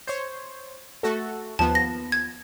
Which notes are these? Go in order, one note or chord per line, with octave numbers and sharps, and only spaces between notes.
C5 C#5
A3 F#4 A4
D#2 F3 B3 A5
A#6
G#6